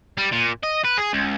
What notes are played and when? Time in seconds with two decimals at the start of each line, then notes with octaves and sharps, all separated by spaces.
0.18 G3
0.32 A#2
0.63 D#5
0.84 B4
0.97 G#4
1.13 C#2